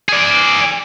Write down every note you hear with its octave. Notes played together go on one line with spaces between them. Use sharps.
G#4 D5